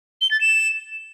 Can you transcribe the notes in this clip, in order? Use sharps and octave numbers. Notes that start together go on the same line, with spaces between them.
G7
A6
E7